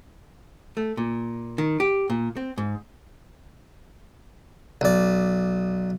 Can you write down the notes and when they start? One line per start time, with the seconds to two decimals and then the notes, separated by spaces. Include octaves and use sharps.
0.77 A3
0.97 A#2
1.58 D#3
1.80 G4
2.10 A#2
2.37 C4
2.58 G#2
4.81 B1 D5